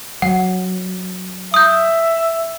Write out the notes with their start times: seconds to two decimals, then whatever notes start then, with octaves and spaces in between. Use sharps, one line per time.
0.22 F#3 F#5
1.54 E5 D#6 G6